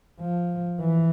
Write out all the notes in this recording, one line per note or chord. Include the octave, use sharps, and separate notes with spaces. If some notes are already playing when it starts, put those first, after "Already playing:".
F3
E3